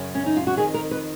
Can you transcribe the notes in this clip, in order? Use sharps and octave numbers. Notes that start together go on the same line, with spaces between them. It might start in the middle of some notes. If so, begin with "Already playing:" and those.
Already playing: F#2 C#3
C#4
D#4
F4
F#4
F2 D#3 G#4
A#4
B4